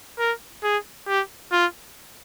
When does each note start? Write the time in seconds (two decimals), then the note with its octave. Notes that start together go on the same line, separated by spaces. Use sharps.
0.19 A#4
0.64 G#4
1.08 G4
1.52 F4